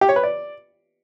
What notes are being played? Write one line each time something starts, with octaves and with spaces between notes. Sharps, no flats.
G4
C#5
B4
D5